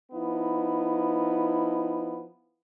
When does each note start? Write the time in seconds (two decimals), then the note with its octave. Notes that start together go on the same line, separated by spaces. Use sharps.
0.12 F3 B3 D#4 E4